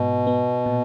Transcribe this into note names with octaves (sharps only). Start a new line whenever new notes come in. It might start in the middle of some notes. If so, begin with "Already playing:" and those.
Already playing: G#2 B2
B3
A#2